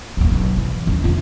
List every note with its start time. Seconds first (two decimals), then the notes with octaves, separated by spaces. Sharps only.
0.17 D1 A#3
0.31 B1
0.57 E3
0.87 E2 D3
1.04 D3 F4